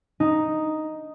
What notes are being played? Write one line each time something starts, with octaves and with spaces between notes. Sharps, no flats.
D#4